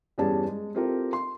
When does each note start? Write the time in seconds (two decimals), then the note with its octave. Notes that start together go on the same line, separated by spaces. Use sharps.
0.18 E2 G2 G3 C#4 G#4 A5
0.47 G#3
0.75 C4 E4 F4 G4 A4 A#4
1.13 C6